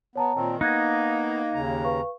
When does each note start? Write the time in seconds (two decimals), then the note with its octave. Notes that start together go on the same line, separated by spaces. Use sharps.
0.16 B3 C#5 A5 A#5
0.35 A#2 D#3 C4
0.61 A#3 B3 D#4 F#6 G#6 A#6
1.54 D#2 C#3 A#5
1.84 B4 F5 C#6